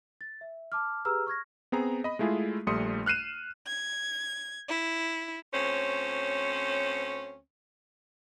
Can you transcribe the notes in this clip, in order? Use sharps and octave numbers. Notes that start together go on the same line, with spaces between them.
A6
E5
A5 D6 F6
G4 G#4 B4 A#5 E6 F6
C#6 F6 G#6 A#6
B3 C4 G#4 A#5
D#5 B5
G#3 A3 E4 F4 G#4
A#1 G3 A3 C6 D#6 C#7
F6 F#6 C7 D#7 E7
G#6
E4
D2 C4 C#4 C5 C#5